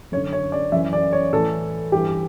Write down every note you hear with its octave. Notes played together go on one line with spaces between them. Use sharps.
F#2 D3 C#5
C#5
D5
F#2 E3 E5
D5
C#5
A2 E3 A4
G2 E3 G4